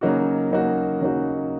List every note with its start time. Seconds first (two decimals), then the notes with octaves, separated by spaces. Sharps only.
0.01 C#3 F#3 A#3 D#4 F#4
0.52 C#3 F#3 A#3 D#4 F#4
1.01 C#3 F#3 A#3 D#4 F#4